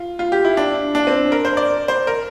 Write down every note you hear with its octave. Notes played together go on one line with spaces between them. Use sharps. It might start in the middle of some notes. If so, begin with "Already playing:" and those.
Already playing: F4
F4
G4
E4
D4
D4
C4
A#4
C5
D5
C5
A#4